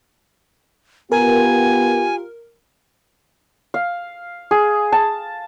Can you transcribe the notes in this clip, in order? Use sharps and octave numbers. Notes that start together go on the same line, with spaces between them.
B3 F4 G4 A#4 G#5
F5
G#4
A5